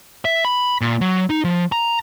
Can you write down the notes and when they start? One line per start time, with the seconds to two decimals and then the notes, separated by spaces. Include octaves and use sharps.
0.25 E5
0.45 B5
0.81 A#2
1.01 F#3
1.30 D#4
1.44 F3
1.72 A#5